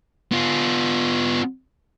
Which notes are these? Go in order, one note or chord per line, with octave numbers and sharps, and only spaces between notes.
B3 F4